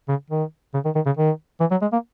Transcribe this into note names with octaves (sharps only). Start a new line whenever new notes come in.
C#3
D#3
C#3
D#3
D#3
C#3
D#3
E3
F#3
G#3
A#3